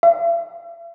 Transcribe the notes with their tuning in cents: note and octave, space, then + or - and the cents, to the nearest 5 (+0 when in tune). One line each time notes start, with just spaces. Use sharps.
E5 +45